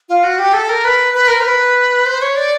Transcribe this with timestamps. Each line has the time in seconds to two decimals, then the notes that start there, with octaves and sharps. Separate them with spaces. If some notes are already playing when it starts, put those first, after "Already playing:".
0.09 F4
0.24 F#4
0.39 G4
0.53 A4
0.69 A#4
0.85 B4
1.14 B4
1.28 A#4
1.40 C5
1.44 B4
2.06 C5
2.22 C#5
2.36 D5